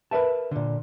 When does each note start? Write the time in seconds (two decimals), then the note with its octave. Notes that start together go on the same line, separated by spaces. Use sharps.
0.11 A#4 B4 D5 E5 A5
0.51 A#2 D3